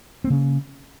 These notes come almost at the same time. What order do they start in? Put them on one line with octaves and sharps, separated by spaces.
C4 A#3 C#3 C#4